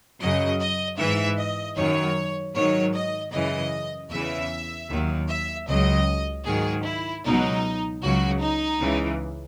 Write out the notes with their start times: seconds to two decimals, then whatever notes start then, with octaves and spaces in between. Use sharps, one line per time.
0.20 F#2 C#3 F#3 D#5
0.60 D#5
0.98 G#2 E3 E5
1.38 D#5
1.76 F#2 D#3 F#3 C#5
2.54 G#2 D#3 F#3 C#5
2.95 D#5
3.33 F#2 C#3 E3 D#5
4.11 E2 C#3 E3 E5
4.89 D#2 D#3 F#3
5.29 E5
5.67 C#2 C#3 F#3 D#5
6.46 G#2 D#3 F#3 G#4
6.84 E4
7.24 C#2 B2 F#3 D#4
8.02 C#2 C#3 F#3 F#4
8.40 D#4
8.80 C#2 C#3 E3